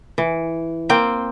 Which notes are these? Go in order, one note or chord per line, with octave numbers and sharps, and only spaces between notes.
E3
A#3 C4 G5